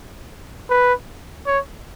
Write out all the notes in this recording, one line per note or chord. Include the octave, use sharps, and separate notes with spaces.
B4
C#5